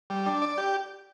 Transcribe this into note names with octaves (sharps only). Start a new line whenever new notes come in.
G3
D4
D5
G4